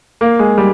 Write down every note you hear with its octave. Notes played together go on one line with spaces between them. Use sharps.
A#3
G#3
G3